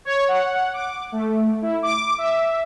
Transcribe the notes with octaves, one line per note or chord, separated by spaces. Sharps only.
C#5
F#5
D6
A3
E4
D6
E5